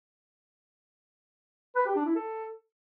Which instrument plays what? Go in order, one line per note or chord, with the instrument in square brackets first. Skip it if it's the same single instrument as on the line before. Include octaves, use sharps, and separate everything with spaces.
[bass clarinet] B4
G4
D4
E4
A4